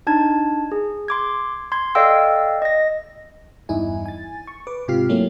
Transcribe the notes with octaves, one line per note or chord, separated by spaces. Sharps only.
D4 D#4 A5 G#6
G#4
C6 D6 G#6
C6 G#6
A4 D5 D#5 F5 G5 E6
D#5 A#6
E2 G2 D#4 E4 G#5
G#5 A6
C#6
B4 D6
G#2 C3 F4 G4 F6 C7
F#3 A3 A#3 C#4 E4